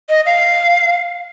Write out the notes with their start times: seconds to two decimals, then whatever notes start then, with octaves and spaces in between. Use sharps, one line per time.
0.09 D#5
0.26 F5